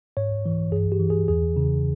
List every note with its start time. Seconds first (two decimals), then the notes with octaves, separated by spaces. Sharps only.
0.17 G#2 C#5
0.46 E3
0.72 G2 G#4
0.92 G4
1.00 E3
1.10 G#4
1.28 E2 G#4
1.56 C#3